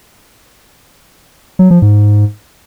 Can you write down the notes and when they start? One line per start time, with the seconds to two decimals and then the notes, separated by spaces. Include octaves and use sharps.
1.59 F#3
1.71 F3
1.82 G#2